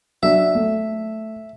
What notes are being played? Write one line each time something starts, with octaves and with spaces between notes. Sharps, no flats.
F#3 D4 E5
A3